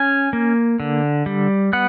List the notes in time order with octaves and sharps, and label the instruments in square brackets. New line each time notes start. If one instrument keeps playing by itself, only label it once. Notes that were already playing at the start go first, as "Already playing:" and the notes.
Already playing: [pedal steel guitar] C#4 G#5
A#3
D3
G3
B3 F#5